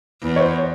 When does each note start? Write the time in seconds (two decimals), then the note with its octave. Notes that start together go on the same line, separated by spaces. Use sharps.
0.22 E2
0.36 C#5
0.41 C5